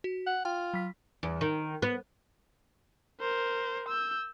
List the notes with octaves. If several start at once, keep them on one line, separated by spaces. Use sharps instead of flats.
F#4
F#5
F4 G5
F#3 B6
E2
D#3
B3
A#4 C5
E6 G6